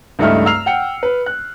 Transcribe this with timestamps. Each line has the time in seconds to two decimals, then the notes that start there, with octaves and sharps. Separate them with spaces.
0.19 C#2 G2 A3 D#4 E5 F6
0.46 A#5 E6 F6 C7 F7
0.66 F#5 G5 C#7
1.03 B4
1.26 F#6